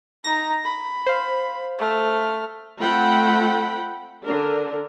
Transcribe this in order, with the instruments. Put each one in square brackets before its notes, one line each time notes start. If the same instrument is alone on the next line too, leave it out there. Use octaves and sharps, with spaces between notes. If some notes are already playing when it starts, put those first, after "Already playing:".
[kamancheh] D#4 A#5 [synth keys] A#6
[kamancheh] B5
[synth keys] C5 F5
[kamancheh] A3 F6
[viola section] A3 C4 F4 F#5 G5 B5
D3 D4 A#4